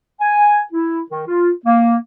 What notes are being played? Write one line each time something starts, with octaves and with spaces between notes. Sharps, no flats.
G#5
E4
D#3
F4
A#3